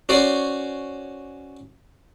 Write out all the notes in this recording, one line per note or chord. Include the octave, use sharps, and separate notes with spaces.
C#4 F#4 C5 D5